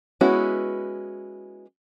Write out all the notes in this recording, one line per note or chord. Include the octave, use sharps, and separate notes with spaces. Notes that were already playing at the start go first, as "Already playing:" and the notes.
G#3 B3 C#4 E4 F#4